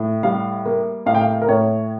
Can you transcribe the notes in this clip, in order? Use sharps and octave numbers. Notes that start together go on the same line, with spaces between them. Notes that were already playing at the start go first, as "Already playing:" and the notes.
Already playing: A2
G3 F5
A#3
A2 F5
G5
F5
A#4
A2 C#5